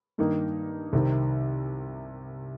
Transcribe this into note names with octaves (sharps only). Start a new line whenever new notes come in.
G2 D#3 A#3 D#4
C2 C3 D#3